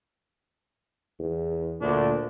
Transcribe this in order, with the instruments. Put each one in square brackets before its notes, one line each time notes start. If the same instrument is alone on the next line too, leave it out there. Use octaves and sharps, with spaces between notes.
[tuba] E2
[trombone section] D2 D4 [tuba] A#2